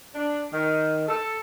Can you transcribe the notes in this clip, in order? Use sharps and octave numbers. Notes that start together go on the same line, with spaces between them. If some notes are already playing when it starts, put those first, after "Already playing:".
D4
D#3
A4